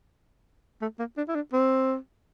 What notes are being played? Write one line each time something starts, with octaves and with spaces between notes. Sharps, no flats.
A3
A#3
D4
E4
D4
C4